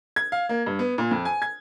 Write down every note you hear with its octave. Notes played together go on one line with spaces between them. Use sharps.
G#6
F5
A#3
G2
B3
A#2
F2
G#5
G#6